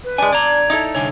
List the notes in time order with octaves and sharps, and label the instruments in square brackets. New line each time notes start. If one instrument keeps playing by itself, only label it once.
[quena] B4
[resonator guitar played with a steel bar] G#3 D4 [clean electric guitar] G#5
[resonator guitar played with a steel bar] D4 [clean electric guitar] D5 A#5 [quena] G#6
[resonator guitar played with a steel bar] D#4 E4 A4
[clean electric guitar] C2 D3 C#5 [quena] G#5